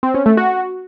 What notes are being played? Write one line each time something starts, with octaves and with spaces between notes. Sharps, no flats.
C4
C#4
A3
F#4